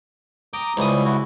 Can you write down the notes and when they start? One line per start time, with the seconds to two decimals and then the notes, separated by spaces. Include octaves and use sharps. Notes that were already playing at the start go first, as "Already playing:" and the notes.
0.54 G5 A#5 D6 D#6
0.77 C#2 F3 G3 E4 D#6
1.05 E4 F#4